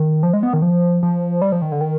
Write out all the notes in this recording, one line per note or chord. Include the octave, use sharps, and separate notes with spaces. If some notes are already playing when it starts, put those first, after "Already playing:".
Already playing: D#3
F3
G#3
B3
D#3
F3
F3
G3
F3
D#3
D3
D#3